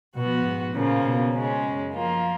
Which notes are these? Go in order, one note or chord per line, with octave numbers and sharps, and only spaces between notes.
B2 F3 B3 F#4
G#2
A#2 C#3 F3 A#3 C#4
B2
C#3 G#3 C#4
F#2
F3 A#3 F4